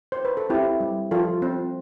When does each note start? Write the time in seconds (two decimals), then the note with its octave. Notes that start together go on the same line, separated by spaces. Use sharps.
0.12 C5
0.25 B4
0.37 A4
0.50 C4 E4 G4
0.80 G3
1.11 F3 F4 A4
1.42 C4